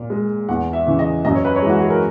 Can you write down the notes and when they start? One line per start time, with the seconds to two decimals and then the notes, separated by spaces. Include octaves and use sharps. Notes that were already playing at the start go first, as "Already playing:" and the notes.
Already playing: A#2
0.10 G#3
0.49 E2 F#5
0.73 E5
0.86 C#3 E3
0.99 D#5
1.25 F#2 D#5
1.35 C#5
1.45 B4
1.56 C#5
1.62 E3 G#3
1.70 F#4
1.80 G#4
1.90 A#4